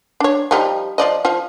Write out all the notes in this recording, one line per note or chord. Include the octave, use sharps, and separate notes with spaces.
D4 C#5
F3 G3 D#4
F3 D5 D#5
F3 F4